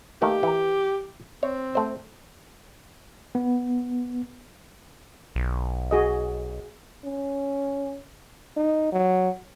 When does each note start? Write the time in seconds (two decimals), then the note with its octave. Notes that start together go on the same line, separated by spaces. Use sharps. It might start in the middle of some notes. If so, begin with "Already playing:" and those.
0.22 D#3 A3 A#3 G4
0.43 E3 A#4
1.43 C4 C#5
1.75 A3 C5
3.35 B3
5.35 B1
5.91 F#4 G#4 D#5
7.05 C#4
8.57 D#4
8.93 F#3